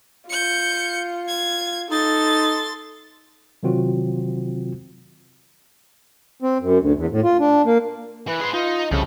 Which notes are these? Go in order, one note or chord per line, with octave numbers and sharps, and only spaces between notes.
F4 G6 C#7
G#6
D#4 A4 C6 A6
C3 D#3 F#3 C4 F4 F#4
C4
F#2
D2
E2
A2
F4
D4
A#3
E3 B4
G#4 C5
D#4 F4
C2 C#3 F3 A4